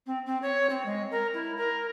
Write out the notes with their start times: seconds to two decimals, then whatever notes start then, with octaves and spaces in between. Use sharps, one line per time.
0.06 C4
0.25 C4
0.42 C#5
0.69 C4
0.85 G#3
1.11 A#4
1.33 E4
1.57 A#4